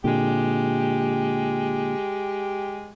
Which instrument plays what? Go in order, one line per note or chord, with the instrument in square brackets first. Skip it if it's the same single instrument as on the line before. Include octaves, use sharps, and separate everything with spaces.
[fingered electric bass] A#2 D3 [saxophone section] G#3 G4